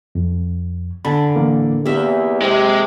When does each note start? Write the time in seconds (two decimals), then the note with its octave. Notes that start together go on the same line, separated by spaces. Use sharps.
0.15 F2
1.05 D3 G#5 A5 B5
1.36 A2 E3 A#3
1.85 E2 A#3 C4 G4 E5
2.42 C3 G#3